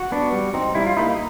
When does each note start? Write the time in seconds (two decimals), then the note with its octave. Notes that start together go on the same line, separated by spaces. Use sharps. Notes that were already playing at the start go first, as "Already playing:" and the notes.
Already playing: F#4
0.12 B3 D4
0.32 G3
0.54 C4 D#4
0.75 G3 E4
0.86 F4
0.97 A#3 D#4 E4